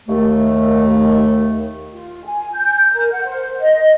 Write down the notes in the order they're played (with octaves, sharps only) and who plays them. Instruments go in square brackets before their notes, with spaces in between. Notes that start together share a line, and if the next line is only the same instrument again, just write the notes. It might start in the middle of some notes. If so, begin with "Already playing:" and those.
[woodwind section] D#2 A3
[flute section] F4
G#5
G6
A#4
F#5
C5
D#5